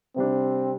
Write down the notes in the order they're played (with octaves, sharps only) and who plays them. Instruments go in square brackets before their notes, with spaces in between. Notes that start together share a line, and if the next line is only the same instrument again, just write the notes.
[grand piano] C3 G3 D4 [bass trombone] C4